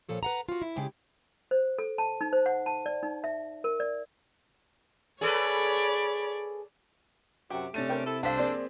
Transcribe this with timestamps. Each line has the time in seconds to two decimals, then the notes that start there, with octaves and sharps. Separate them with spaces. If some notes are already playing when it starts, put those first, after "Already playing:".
0.09 A#2 F3 A4 C#5
0.23 B4 F#5 A#5
0.49 F4 F#4
0.62 E4
0.76 C#3 G#3 E4 G4
1.51 C5
1.79 A4
1.98 A5
2.21 D#4
2.33 C5
2.46 F#5
2.66 A5
2.86 D5
3.03 D#4
3.24 E5
3.64 A#4
3.80 D5
5.21 G#4 A4 B4 C#5 D5 B5
7.50 F#2 C3 F#4 G4
7.74 C3 A3 C#4 D4 A6 D#7
7.89 A#4 C5 G5
8.05 E4 A4
8.23 C2 D4 A4 C5 F5 F#5 B6
8.37 F3 A#3 C4 G#4 D5